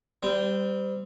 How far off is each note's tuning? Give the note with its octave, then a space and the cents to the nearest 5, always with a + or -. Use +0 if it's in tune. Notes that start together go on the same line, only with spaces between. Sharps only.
G3 +0 C4 -30